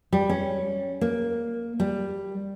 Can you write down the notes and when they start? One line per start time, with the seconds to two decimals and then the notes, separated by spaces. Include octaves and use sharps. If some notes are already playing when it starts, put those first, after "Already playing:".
0.13 G3
0.29 C#4
1.01 A#3
1.80 G3